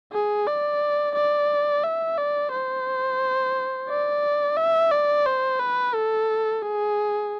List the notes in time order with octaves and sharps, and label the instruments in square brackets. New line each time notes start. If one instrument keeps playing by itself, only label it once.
[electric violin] G#4
D5
D5
E5
D5
C5
D5
E5
D5
C5
B4
A4
G#4